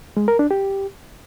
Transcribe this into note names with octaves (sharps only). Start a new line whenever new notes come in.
G#3
A#4
D4
G4